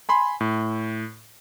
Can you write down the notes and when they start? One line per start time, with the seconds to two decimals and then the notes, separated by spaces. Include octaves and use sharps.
0.09 G#5 B5 C6
0.41 A2